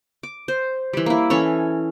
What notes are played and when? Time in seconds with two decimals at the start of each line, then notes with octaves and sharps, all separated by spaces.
0.23 D6
0.48 C5
0.93 E3 G3
1.06 A#3 E4
1.30 E3 C#4 A4 C#5